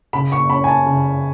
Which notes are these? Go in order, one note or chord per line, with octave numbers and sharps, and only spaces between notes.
C#3 B5
C#6
C#4 B5
G#5
A5
C#3